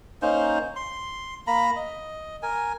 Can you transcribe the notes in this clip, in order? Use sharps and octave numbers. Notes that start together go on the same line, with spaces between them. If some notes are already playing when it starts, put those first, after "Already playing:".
A#3 C#4 D#4 C5
C6
A#3 A#5 B5
D#5
A#4 G#5